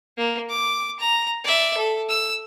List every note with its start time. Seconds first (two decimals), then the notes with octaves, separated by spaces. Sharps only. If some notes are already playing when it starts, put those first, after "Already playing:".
0.17 A#3
0.50 D6
1.00 A#5
1.44 D5 E5
1.77 A4
2.09 E6